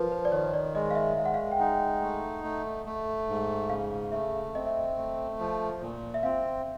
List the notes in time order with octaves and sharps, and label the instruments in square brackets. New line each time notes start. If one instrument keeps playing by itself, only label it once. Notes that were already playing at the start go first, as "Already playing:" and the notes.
Already playing: [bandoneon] F3 [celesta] F4 A#4 B4
[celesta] C5
D5
[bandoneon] D#3 [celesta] C#5
[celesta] D5
[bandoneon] G#3 [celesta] D#5
[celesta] F5
E5
[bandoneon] G#3 [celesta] F5
[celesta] F#5
F5
G5
[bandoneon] D#4 [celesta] F#5
[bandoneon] A3
A3
A3
G#2
[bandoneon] C#3 [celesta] F5
[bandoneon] A3 [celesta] E5
[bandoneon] C4 [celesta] D#5
[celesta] E5
D#5
[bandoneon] A3
F3
A#2
[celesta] E5
[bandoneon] C4 [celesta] F5